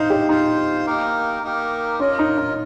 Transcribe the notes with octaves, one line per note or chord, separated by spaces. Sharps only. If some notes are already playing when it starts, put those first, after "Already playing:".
Already playing: D#4 C5 F5
G4
D#4 F4 C5 F5
A#3 D#4 G4 A#4
A#3 D#4 G4 A#4
C#4 F4 A#4 D#5
D#4
D#4